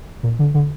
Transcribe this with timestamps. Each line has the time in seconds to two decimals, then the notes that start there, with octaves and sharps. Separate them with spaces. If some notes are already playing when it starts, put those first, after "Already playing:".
0.23 A#2
0.39 D3
0.54 D3